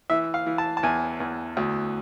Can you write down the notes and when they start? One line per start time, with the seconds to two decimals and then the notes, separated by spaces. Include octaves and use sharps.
0.10 E3 E5
0.34 F5
0.46 E3
0.58 A5
0.77 A5
0.83 E2 G#5
1.20 E2
1.57 D2